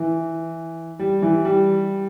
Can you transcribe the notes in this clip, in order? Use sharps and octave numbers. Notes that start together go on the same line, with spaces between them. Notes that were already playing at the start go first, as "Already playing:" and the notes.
Already playing: E3
G3
E3
G3